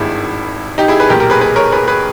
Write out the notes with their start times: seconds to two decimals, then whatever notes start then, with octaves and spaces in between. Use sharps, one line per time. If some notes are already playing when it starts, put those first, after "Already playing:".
Already playing: G#1 G2 D#3 E4 G#4
0.78 D#4 G4
0.88 E4 G#4
1.00 G#4 B4
1.09 B1 G4 A#4
1.14 A#2
1.20 G4 A#4
1.30 G#4 B4
1.41 G#4 B4
1.56 A#4 C#5
1.72 G#4 B4
1.88 G#4 B4